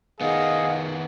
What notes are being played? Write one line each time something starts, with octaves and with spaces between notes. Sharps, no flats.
D#3 B3 G#4 D#5 F5 F#5